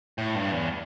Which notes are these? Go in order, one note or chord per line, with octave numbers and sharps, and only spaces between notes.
A2
G2
E2